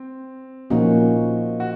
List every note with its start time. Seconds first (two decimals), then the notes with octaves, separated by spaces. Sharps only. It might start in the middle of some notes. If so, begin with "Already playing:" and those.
Already playing: C4
0.70 A#2 F3 A#3 C#4 D#4 F#4
1.60 F#4